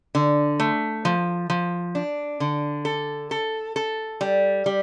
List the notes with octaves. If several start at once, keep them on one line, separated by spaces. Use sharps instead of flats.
D3
A3
F3
F3
D4
D3
A4
A4
A4
G3
G3